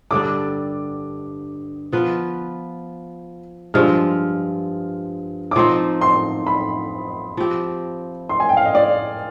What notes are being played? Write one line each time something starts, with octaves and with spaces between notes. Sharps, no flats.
G2 D3 G3 D4 D6
F3 B3 F4 B4
G2 F3 G#3 F6
D6
F3 C4 D#4 C6
C6
B5
F3 C4 G4
C6
G#5
G5
F5
D#5
D5